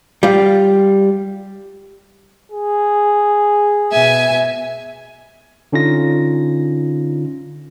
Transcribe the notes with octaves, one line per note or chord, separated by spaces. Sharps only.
G3 F4
G#4
B2 E5 G#5
D3 C#4 D#4 F4 A#6